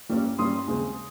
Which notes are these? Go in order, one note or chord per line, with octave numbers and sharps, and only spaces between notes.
G2 G3 A#3 C#4
G2 G3 A#3 C#4 C6 D#6
D#2 C#3 G#3 C4